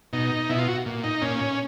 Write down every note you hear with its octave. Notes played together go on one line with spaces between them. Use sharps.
B2 D#4
B2 E4
F4
F#4
A#2
D#4
A#2 C#4